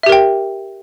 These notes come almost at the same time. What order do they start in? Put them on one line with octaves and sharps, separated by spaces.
E5 G4 A#4 G5